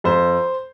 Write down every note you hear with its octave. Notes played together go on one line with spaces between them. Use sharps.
F2 C5